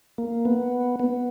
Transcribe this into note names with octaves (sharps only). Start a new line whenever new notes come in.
A#3
B3
B3